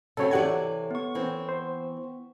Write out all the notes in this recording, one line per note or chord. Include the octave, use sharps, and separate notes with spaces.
C#3 F#3 C4 A4 C#5
C3 E3 G4 D5 F#5 G#6
B3 C#6
E3 C4
C5